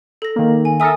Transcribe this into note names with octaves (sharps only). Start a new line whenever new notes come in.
A4 A#6
D#3 A#3
G#5
A4 A#4 E5 G#5 D#6